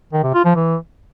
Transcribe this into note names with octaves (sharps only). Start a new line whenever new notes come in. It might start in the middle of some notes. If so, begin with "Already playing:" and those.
D#3
C3
F4
F3
E3